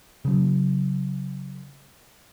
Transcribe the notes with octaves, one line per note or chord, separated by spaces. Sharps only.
C#3 F#3